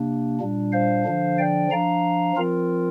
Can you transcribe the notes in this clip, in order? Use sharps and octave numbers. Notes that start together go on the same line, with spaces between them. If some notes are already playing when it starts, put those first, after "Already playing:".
Already playing: C3 A#3 D4
A#2 G3 D4
C5 F5
D3 F3 D4
D5 G5
F3 D4 F5 A#5
F3 C4 F4 A#4